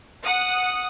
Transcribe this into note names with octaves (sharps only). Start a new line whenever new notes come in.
F#5 D#6